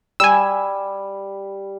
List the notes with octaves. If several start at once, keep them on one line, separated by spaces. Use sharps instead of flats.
G3 G#5 E6